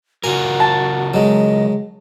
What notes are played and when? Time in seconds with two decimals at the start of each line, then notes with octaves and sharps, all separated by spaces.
0.24 C#3 F4 F#4 A#4 G#5
0.60 A5
1.14 F#3 G#3 D#5